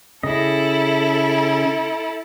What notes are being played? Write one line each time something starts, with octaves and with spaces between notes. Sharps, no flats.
C#3 E4 A4 D#5